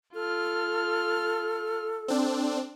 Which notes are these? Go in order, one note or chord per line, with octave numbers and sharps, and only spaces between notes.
F4 A4 F6
C4 D4